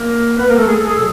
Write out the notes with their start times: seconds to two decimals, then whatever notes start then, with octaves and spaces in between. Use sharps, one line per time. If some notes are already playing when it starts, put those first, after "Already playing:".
Already playing: A#3 A#4
0.36 B3 B4
0.47 A#3 A#4
0.57 A3 A4
0.67 G#4
0.76 A4
0.86 G#4
0.95 B2 F#3 A4